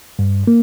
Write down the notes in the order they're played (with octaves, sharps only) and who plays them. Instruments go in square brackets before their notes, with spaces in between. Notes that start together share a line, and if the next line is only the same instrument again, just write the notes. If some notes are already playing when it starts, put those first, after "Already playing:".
[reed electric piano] G2
A#3